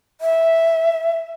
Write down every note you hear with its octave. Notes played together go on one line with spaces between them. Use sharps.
E5